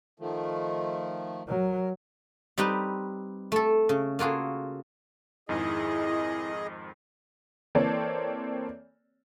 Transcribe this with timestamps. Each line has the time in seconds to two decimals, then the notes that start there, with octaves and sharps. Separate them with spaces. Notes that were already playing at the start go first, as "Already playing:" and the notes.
0.20 D#3 F3 A3
1.48 F#3 A#4
2.58 G3 C4 D#4 G4 B4
3.52 A3 A4
3.89 C#3
4.19 A#3 F4 F#4 G#4 A4
5.49 F2 G#2 D#3 E4 G#4 D#5
7.75 E3 A#3 C4 A4 C#5 D5